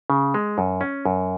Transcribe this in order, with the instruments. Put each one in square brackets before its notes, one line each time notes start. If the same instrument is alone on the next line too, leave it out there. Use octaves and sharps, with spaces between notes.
[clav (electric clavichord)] C#3
G#3
F#2
C#4
F#2